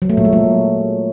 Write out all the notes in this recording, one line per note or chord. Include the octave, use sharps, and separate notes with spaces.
F#3
A3
A#2
G#3
F#3